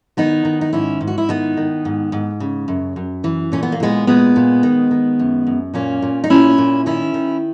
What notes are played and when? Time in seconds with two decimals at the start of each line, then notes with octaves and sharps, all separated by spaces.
0.17 D#3 B3 D#4
0.45 D#3
0.61 D#4
0.73 G#2 C#4 E4
1.01 G#2
1.07 F#4
1.18 E4
1.29 D#3 B3 D#4
1.57 D#3
1.85 G#2
2.12 G#2
2.40 C#3
2.68 F#2
2.96 F#2
3.24 E3
3.52 A#2 C#4
3.63 B3
3.72 A#3
3.80 A#2 G#3 B3
4.07 A#2 G#3 B3
4.36 A#2
4.63 D#3
4.91 D#3
5.19 F#2
5.47 F#2
5.74 A#2 A#3 C#4
6.02 A#2
6.24 D#4
6.30 A#2 C#4 E4
6.58 A#2
6.86 D#3 C#4 E4
7.14 D#3